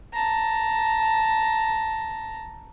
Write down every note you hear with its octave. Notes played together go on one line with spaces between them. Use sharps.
A5 A#5